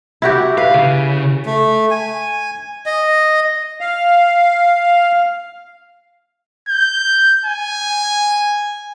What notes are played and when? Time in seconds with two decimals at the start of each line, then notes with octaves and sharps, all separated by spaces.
0.22 E4 F#4 G4
0.58 B4 F5
0.74 C#3
1.44 A3
1.91 G#5
2.86 D#5
3.81 F5
6.68 G6
7.45 G#5